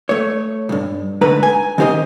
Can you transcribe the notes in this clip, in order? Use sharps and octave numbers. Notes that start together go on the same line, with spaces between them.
A3 C#5
B1 G2
G#2 D3 A3 B4 A#5
G#5
D#3 C#4 G4 C5 D#5